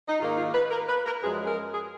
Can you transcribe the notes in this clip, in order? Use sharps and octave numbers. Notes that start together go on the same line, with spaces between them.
D#4
G#2 D#3 A#3 F4
F4
B4
A#4
B4
A#4
F#2 F3 G#3 G#4
G#4
A#4
G#4